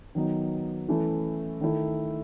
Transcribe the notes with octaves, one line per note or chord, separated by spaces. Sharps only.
D#3 F#3 B3 D#4
E3 A3 C#4 E4
D#3 A3 E4